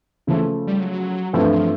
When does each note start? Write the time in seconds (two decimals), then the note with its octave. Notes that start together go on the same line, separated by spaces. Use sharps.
0.27 C#3 E3 F3 A3
0.67 G3
0.80 F#3
1.33 G2 E3 F3 A3 C4 E4
1.52 F3